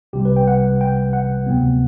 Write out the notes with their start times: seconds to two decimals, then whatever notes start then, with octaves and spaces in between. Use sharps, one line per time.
0.13 C2 C3 G3 G4
0.25 B4
0.36 G5
0.48 F#5
0.81 G5
1.13 F#5
1.46 D2 C3 F#3 B3